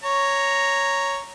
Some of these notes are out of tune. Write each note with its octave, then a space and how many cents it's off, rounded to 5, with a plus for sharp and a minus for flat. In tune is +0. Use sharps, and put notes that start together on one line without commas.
C#5 +0 A#5 +0